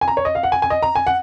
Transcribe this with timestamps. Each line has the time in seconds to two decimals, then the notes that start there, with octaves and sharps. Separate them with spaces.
0.01 G#5
0.08 A#5
0.17 C#5
0.25 D#5
0.35 F5
0.43 F#5
0.52 G#5
0.62 G#5
0.70 D#5
0.83 A#5
0.95 G#5
1.07 F#5